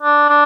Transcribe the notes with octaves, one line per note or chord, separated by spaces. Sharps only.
D4
D4